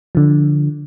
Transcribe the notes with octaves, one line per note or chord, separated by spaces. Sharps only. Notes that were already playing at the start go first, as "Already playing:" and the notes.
D3 F3